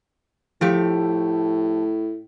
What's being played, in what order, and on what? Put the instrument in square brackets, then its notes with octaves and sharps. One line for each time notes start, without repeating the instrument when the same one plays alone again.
[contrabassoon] A2 [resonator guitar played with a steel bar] F3 A3 G4